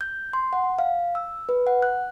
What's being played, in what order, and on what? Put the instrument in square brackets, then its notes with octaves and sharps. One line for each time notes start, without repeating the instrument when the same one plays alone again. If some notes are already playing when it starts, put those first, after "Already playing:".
[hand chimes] G6
C6
F#5
F5
E6
B4
F#5
F#6